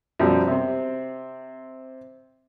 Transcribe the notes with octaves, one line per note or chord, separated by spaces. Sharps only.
F#2 B2 F3 G3
C3 C4